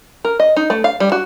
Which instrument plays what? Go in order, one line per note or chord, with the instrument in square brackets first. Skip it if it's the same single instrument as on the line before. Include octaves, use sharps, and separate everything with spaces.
[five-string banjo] A#4
D#5
D#4
A3
F5
G3
F#4